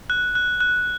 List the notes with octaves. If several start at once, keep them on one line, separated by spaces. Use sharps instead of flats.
F#6
F#6
F#6